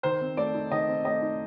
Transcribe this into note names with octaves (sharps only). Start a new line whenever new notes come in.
D#3 C5
C4
A3 D5
D#4
D#3 D#5
C4
A3 D#5
D#4